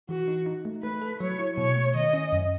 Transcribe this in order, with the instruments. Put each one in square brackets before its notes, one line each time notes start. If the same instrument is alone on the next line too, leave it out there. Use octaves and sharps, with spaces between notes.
[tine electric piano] E3 [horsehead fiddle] F#4
[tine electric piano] D#4
D#4
A3
[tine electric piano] A3 [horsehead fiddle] B4
[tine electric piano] A4
[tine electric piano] F#3 [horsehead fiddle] C#5
[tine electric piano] E4
[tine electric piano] B2 [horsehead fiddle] C#5
[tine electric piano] A3
[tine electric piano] D#3 [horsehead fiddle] D#5
[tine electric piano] C#4
F#2